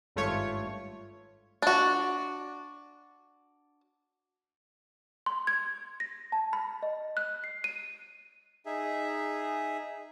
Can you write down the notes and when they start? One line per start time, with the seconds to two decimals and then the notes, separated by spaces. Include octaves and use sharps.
0.16 G#1 G2 A3 F4 C#5
1.62 D4 F#4
5.26 C6
5.47 G#6
6.00 A#6
6.32 A5
6.53 B5
6.83 D#5
7.17 F#6
7.44 C7
7.64 D#7
8.66 D#4 G#4 E5